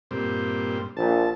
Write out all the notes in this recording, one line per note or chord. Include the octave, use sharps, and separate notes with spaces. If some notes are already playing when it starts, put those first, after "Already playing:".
G2 A#2 C4
A#1 A5